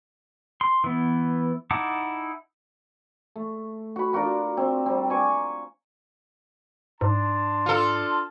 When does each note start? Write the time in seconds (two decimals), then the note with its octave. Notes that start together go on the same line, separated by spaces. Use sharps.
0.61 C6
0.84 E3 B3
1.71 D#4 E4 F#5 A5 D6
3.36 A3
3.96 F#4 B5
4.13 D4 F4 F#4 A#4
4.57 C4
4.86 G3 C4
5.10 G#5 C#6 D6
7.01 G#2 D4 A5 C6
7.66 F4 A4